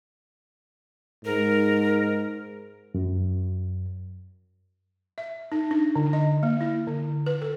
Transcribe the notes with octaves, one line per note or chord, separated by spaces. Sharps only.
G#2 A#4
F#2
E5
D#4
D4
D3
D#5
A#3
E4
D3
B4
A4